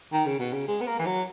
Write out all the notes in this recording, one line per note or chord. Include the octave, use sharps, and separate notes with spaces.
D#3
C#3
B2
C#3
G#3
B3
A#3
E3
F#3